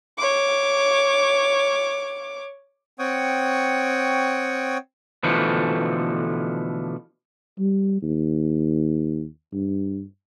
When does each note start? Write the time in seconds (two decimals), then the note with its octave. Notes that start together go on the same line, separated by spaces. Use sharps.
0.19 C#5 D6
2.99 C4 C#5 F#5 G5 C#6 D#6
5.23 B2 D3 E3 F3 A3
7.59 G3
8.02 D#2
9.52 G2